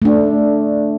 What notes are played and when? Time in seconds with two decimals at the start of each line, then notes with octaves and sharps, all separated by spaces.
0.02 A3 D4